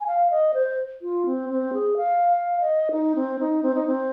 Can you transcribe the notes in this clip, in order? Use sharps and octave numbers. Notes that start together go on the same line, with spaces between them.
G#5
F5
D#5
C5
F4
C4
C4
G#4
F5
F5
D#5
D#4
C4
D#4
C4
D#4
C4